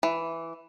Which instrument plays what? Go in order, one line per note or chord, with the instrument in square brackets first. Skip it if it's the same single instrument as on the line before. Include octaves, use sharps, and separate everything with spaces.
[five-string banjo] E3